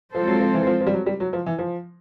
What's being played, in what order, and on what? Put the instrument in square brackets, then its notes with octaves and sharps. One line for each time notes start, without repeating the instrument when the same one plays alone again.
[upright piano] F3 [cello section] G#3 C4 F4 A4 C5
[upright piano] F#3
F3
E3
F3
F3
G3
F#3
G3
F#3
F3
E3
F3